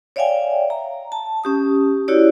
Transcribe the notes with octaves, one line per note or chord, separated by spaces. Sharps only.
C#5 D5 E5 F5 G5 G#5
A#5
A5
C#4 G4 D#6
E4 F#4 G4 C#5 D5